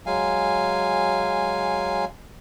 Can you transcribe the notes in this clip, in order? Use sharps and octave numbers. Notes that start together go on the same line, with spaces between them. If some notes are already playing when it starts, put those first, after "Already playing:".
F#3 G#3 F5 G#5